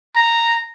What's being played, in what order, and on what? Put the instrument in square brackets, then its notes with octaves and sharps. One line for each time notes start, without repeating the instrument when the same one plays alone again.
[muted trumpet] A#5